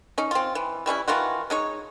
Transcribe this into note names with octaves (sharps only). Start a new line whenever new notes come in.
C#4 D#4
C4 F4
E3
E3 G3 C#4 E4
D#3 E3 F4 F#4
G#3 D#4 C#5